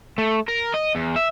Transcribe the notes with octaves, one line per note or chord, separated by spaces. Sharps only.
A3
A#4
D#5
E2
E5